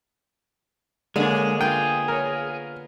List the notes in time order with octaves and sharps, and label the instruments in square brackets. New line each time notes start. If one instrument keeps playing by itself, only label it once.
[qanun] D3 A#3 [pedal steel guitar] G#3 [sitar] C#4 D4 G#4
[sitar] B3 F4 [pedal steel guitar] G#4 [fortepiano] G5
[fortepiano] A#4 C#5